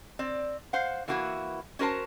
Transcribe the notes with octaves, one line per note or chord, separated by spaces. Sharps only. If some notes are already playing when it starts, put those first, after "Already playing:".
C4 D5
C5 F5 F#5
E3 A#3 E4 F#4 A#4 B4
C#4 F#4 A#4 C5 A5